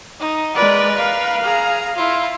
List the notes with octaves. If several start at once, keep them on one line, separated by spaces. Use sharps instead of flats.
D#4
G#3 A#4 B4 D5
F5
G#4 A#5
E4 F4